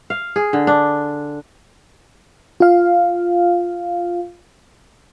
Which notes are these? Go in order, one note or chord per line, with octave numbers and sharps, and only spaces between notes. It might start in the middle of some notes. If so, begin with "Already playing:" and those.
F5
G#4
D3
D4
F4 F5